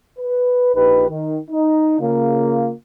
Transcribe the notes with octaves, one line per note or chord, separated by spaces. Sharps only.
B4
A#1 D#4 G4 B4
D#3
D#4
C#3 A#3 F4